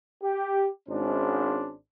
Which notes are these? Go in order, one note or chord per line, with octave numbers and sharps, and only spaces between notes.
G4
G#1 G#2 C#4 D4 C5